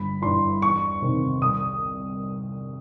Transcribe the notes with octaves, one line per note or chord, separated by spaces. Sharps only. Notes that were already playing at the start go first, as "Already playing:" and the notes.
Already playing: G1 B5
G2 E3 C6
E2 C#6
C3 D#3
C2 D#6